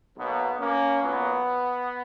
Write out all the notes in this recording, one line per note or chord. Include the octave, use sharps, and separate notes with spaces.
B1 B2 F#3 A#3 B3
A#3 C#4
B1 A#2 F#3 B3